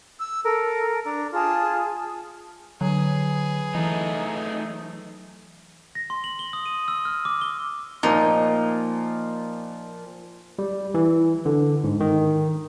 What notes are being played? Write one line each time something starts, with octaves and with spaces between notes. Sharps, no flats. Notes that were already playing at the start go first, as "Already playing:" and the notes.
E6
A4 A#4
D4 A#5
F4 G#4 A5
D3 F#3 G#4 B4
E3 A3 D#4
A#6
C6
F#7
G7
D#6
D#7
E6
F6
D6
G7
A#2 F3 D#4
G3
E3
D3
G#2
D#3